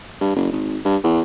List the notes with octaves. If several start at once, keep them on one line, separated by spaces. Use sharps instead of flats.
G2
F#1
G#1
G2
E2